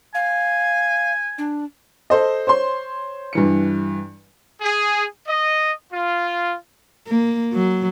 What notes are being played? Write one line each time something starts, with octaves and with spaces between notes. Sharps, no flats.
F5 G#5
D4
A4 C5 D#5
C5 C#5 C6
G2 E3 C#7
G#4
D#5
F4
A#3
F#3